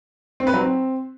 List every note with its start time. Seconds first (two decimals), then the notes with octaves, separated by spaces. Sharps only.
0.40 C4
0.47 B4
0.54 F#3
0.60 C4